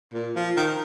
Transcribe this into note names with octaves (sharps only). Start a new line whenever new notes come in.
A#2
F3
D#3